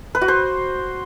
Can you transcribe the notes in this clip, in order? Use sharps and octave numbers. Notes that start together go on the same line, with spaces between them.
B4
F#4
C5